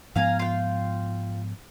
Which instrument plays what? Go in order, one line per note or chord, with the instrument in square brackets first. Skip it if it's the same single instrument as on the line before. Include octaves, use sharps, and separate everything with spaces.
[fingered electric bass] G#2 F3 B3 [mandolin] F5 G#5 A#5
[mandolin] F4 G5